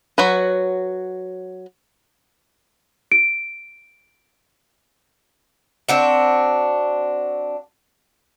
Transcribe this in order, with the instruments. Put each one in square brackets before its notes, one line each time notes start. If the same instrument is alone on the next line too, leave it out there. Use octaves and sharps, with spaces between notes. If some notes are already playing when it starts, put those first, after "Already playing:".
[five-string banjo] F#3 F#4 B4
[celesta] D7
[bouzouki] C4 D4 F#4